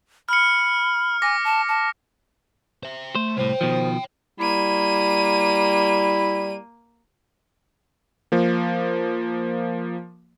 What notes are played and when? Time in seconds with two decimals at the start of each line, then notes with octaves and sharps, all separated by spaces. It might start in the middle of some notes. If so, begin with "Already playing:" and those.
0.29 B5 F6 C#7
1.22 G#5 D6 A#6
1.44 A5
1.68 A5
2.83 C5 E5
3.15 A3 C5
3.37 C2 A2 C5 C#5 G5
3.61 B2 D#3 F3
4.40 G3 A#3 E4 D#7
8.32 F3 A#3